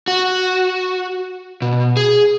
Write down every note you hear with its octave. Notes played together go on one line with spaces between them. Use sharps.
F#4
B2
G#4